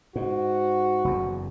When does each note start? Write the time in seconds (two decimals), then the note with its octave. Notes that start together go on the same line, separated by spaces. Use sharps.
0.16 G#2 F#4
1.05 F#1 E2